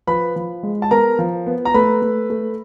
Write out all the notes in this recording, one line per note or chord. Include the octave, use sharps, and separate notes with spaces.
F3 B4 B5
F3
G#3
A5
B3 A#4 A#5
F3
B3
A#5
A3 B4 B5
A3
A3